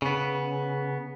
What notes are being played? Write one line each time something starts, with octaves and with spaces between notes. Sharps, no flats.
C#3 B3